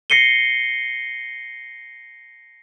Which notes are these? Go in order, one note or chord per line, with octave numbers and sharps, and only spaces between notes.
A#6 C7 C#7 D#7 G7